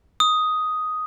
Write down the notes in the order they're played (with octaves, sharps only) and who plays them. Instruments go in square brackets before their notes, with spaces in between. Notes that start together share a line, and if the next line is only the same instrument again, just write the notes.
[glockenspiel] D#6